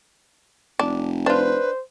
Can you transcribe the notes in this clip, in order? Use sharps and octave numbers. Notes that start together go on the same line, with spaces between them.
F1 D4
D4 F4 B4 C5